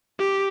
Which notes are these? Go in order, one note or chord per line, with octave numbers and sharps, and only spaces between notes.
G4